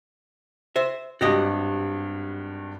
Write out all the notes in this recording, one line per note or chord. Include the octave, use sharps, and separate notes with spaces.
C5 E5
G#1 G2 F#4 G4 D#5